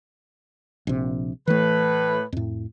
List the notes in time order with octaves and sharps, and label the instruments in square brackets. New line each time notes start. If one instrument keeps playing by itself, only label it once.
[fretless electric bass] A#1 C3
[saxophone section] A2 B4 [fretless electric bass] E3 A3
[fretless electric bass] F2 A2